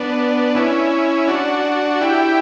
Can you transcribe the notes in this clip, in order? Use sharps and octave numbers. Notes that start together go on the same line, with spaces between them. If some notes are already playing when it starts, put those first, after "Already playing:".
Already playing: B3 D4
C#4 E4
D4 F#4
E4 G4